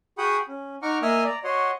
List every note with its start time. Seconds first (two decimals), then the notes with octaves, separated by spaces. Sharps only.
0.18 F#4 G#4 F#5 G5 B5 D#6
0.48 C#4
0.82 D#4 F#5 A#5 C#6 D6 F6
1.02 A#3 D#5 E5 G#5 D#6 F6
1.24 D5 A#5
1.44 F#4 C#5 D#5 F#5 C6